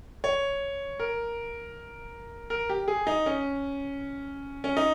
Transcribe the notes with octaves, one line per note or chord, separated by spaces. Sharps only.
C#5
A#4
A#4
G4
G#4
D#4
C#4
C#4
D#4